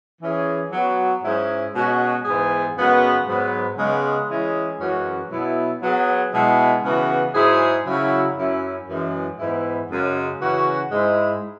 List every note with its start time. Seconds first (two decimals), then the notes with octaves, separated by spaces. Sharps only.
0.21 E3 C#4 G#4
0.72 F#3 B3 F#4
1.23 G#2 G#3 C#4 E4 G#4
1.74 B2 G#3 C#4 F#4
2.25 G#2 E3 B3 G#4
2.76 F#2 C#3 G#3 B3 F#4
3.27 G#2 F#3 B3
3.78 C#3 G#3 B3
4.29 E3 G#3 C#4 E4 G#4
4.80 F#2 E3 G#3 C#4 F#4
5.31 B2 F#3 B3 E4
5.82 F#3 B3 G#4
6.32 B2 G#3 E4
6.83 C#3 E3 B3 F#4
7.34 G#2 F#3 E4 G#4
7.86 C#3 F#3 E4
8.36 F#2 F#3 C#4 E4
8.87 F#2 E3 G#3
9.39 G#2 E3 B3 E4
9.89 F#2 C#3 G#3
10.40 C#3 E3 C#4 F#4
10.91 G#2 G#3 E4